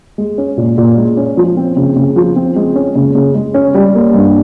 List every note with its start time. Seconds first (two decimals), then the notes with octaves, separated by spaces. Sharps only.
0.18 G#3
0.38 C#4
0.57 A#2
0.78 A#2
0.98 G#3
1.17 C#4
1.37 F3
1.57 C4
1.77 C#3
1.96 C#3
2.16 F3
2.36 C4
2.56 G#3
2.75 C#4
2.96 C#3
3.15 C#3
3.34 G#3
3.54 C#4
3.75 G3
3.95 A#3
4.14 G2